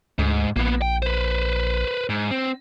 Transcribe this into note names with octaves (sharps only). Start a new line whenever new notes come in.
D2 G#2
A#1 A#3 B3
G5
B4 C5
G#2
C4